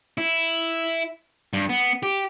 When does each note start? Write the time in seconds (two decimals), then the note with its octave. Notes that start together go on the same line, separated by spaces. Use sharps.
0.18 E4
1.53 G2
1.69 B3
2.03 G4